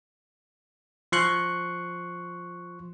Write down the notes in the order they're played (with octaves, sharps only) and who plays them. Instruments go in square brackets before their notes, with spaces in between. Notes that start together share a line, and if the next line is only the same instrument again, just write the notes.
[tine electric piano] F3 C6 C#6 F#6